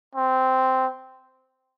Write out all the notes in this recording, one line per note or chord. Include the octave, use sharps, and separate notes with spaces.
C4